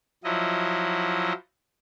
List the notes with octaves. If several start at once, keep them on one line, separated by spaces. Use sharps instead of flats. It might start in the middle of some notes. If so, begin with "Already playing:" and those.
F3 F#3 E4 D#5